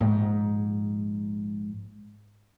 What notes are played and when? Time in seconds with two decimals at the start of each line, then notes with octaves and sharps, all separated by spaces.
0.01 A#1 G#2